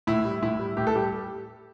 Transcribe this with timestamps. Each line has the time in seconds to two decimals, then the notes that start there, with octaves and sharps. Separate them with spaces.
0.07 A2 E4
0.25 G3
0.42 A2 E4
0.59 G3
0.77 A2 G4
0.87 A4
0.95 G3 G4